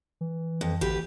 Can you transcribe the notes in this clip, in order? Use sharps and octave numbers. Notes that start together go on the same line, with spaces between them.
E3
F2
A1 D2 G4 B4